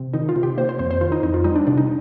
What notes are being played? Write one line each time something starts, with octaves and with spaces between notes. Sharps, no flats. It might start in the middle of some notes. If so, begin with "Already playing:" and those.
Already playing: C3
D#3 D#4
F4
C3
G4
A#3 C5
C5
F2 C5
C5
D#3 F4
D#4
F2 D#4
F4
G3 D#4
D4
C3 D4
D#4